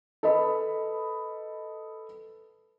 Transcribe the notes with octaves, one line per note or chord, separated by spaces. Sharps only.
A4 B4 D#5 B5